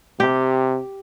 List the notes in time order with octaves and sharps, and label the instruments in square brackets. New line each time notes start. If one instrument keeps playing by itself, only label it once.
[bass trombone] C3 [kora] G4